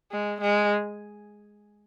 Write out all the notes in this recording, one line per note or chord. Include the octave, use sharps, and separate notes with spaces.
G#3
G#3